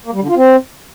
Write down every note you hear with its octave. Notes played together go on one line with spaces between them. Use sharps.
A#3
G3
D3
F4
C4